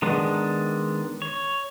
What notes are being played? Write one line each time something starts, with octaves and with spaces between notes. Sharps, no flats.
D#3 G#3 B3 D4
C#5